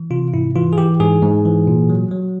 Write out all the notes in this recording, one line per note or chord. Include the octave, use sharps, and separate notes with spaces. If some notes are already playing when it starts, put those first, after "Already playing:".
Already playing: E3
C3 F4
G#2 E4
E3 F4
G#4
E3 G4
G#2 G#4
G#2
E3
A#2
F#3
F#3